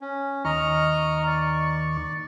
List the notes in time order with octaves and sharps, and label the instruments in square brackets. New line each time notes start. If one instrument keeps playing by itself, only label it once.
[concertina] C#4
[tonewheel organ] D#2 D#3 C#6 [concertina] D#5 A#5 F6
[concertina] D5